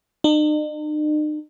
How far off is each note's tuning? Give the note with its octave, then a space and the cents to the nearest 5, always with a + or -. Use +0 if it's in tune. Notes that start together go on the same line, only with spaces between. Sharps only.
D#4 -45